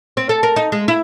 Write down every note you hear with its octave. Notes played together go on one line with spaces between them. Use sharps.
C4
A4
A#4
D#4
G#3
E4